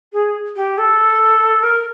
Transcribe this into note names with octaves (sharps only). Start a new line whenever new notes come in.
G#4
G4
A4
A#4